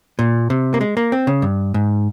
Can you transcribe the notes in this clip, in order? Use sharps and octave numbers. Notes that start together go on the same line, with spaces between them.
A#2
C3
A#3
G#3
A#3
C4
C#3
G2
G#2